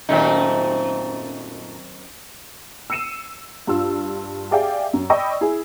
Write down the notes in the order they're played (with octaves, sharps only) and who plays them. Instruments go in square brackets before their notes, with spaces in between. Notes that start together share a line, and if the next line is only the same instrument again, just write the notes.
[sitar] F#2 D#3 C4 [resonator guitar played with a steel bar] A#2 A3 D#4
[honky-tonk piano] E6 C7 C#7 D#7 E7
G2 F4 E6
G4 G#4 D5 E5 F5 G5
F#2
D5 D#5 G5 B5 C#6 E6
E4 G#4